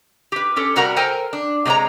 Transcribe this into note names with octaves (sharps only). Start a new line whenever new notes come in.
G4 B4
C#4 G4 A4 C#5
C3 G3 F#4 A#4 F#5 A#5
A4 A#4 C5 G5 G#5 A#5
D4
C3 G#3 G4 C#5 A#5